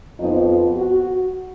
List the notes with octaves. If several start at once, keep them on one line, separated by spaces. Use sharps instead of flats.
F2 F3 B3 D#4
F4
F#4